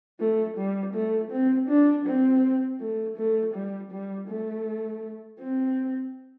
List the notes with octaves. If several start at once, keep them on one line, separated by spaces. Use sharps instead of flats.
A3
G3
A3
C4
D4
C4
A3
A3
G3
G3
A3
C4